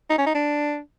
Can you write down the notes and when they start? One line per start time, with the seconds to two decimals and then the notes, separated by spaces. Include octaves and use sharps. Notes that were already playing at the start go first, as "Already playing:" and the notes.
0.10 D#4
0.18 C#4
0.26 D#4
0.35 D4